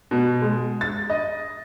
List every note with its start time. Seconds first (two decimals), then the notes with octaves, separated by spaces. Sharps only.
0.11 B2
0.42 G#3
0.81 A6
1.10 D#5